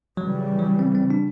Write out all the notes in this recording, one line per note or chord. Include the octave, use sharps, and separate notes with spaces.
C#3 E3 F#3 G3
F#3
C4
C4
D4